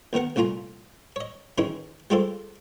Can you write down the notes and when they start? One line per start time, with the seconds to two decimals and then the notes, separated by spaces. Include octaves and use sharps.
0.13 D#2 D#3 B3 A#4 F#5
0.36 C2 A#2 A3 F4 G#5 A#5
1.16 C#5 D#5
1.58 D#3 E3 C#4 D#4 E4 G#4
2.10 G3 G#3 F4 G4 A4 C5